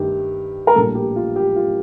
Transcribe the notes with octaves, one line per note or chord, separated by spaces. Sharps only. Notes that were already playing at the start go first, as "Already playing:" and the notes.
Already playing: G2 D#3 A3 G4
A#4
A#1 A2 G3 A#3 A4
G4
F4
G4
F4